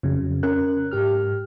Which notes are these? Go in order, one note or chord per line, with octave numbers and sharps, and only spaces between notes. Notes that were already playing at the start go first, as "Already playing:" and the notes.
F2 C#3 F#3
C#4 A#4 F#6
G#2 G4 F6